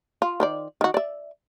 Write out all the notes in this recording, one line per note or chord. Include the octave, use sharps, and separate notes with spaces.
F4
D#3 C5 D5
D#3 F#4
D5 E5